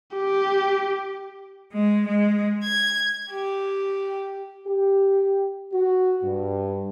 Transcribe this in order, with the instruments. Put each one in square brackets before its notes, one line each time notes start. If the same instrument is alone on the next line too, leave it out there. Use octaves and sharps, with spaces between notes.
[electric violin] G4
[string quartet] G#3
G#3
G#6
[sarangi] G4
[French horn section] G4
F#4
G2